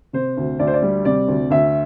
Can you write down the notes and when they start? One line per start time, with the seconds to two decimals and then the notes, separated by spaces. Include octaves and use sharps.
0.13 C3 C5
0.37 D2
0.59 D2 D5
0.67 C5
0.74 D5
0.82 G3
1.05 C3 D5
1.28 D2
1.50 D2 E5